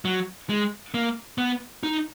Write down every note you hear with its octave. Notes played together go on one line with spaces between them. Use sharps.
F#3
G#3
A#3
B3
D#4